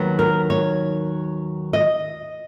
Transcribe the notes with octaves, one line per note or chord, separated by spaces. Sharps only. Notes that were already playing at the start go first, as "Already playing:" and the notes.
Already playing: D#2 D#3 F#3 B3
A#4
C#5
D#5